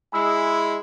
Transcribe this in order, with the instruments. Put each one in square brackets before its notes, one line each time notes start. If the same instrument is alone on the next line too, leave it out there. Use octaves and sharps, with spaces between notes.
[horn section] G#3 E4 [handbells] G#5 B5 E6